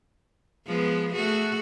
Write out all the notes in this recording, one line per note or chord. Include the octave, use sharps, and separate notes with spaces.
F3 G#3 B3
A3 F#4 G#4